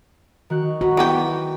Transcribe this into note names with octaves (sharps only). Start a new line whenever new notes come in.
D#3 F#4 F#6
F#4 B4 A#5
E3 B3 G4